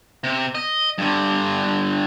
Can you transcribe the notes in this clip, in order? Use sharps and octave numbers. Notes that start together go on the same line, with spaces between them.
C3
D#5
G2 D3